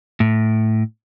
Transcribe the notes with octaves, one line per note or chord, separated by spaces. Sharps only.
A2